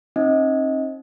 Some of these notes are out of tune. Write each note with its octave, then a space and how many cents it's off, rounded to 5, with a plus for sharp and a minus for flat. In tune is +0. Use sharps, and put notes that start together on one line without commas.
C4 +45 D#4 +0 D#5 +25